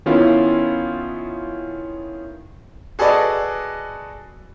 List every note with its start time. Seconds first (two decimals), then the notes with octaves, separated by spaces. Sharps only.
0.06 D#3 B3 C#4 E4 F4
2.99 F#4 G#4 A4 B4 D5 D#5